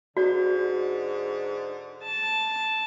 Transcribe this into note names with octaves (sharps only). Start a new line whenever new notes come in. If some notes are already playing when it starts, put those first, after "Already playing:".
G#2 D3 F#4 D5
A5